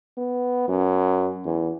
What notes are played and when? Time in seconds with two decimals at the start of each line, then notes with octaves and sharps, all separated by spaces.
0.17 B3
0.68 F#2
1.45 E2